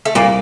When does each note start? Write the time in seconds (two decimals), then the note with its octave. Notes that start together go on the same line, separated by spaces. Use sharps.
0.05 A3
0.15 C2 A#2 A#3